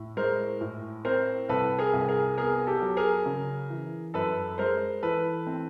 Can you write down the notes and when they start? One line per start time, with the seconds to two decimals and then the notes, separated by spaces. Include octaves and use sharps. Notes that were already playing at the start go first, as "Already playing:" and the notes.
Already playing: A2
0.17 G#3 A#4 C5
0.61 A2
1.05 C4 A#4 C5
1.49 C2 A4 B4
1.79 G#4 A#4
1.93 C2
2.08 G#4 A#4
2.37 B3 G#4 A#4
2.67 G4 A4
2.82 F#3
2.97 G#4 A#4
3.26 C#3
3.70 E3
4.14 F#2 A4 B4
4.58 G#3 A#4 C5
5.03 E3 A4 B4
5.47 C4